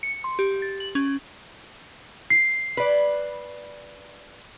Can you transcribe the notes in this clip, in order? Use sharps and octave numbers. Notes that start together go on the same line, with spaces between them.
C#7
C6
G4
A6
F#7
C#4
C7
B4 D5